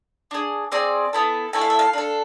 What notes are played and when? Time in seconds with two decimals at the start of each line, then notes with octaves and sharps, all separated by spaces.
0.31 D4 G#4
0.72 C4 G#4 D5
1.13 B3 E4 A4
1.53 A3 E4 A4 G#5
1.61 F5
1.70 E5
1.79 F5
1.93 D4 A4